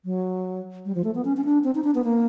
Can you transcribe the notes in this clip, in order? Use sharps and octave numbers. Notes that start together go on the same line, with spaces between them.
F#3
G3
F3
A3
B3
C#4
C#4
D4
C4
D#4
D4
B3
A#3